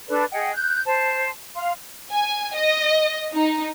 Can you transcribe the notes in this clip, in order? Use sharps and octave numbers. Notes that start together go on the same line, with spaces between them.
D4 A4 B4 D5
G#4 D#5 F#5 G5
F#6 G6
C5 A5
F5 C6
G#5
D#5
D#4